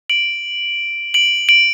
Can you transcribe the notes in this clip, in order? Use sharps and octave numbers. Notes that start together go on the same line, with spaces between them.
D7 F#7
D7 F#7
D7 F#7